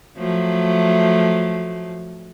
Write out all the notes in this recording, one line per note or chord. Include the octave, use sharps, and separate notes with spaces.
F3 F#3 A3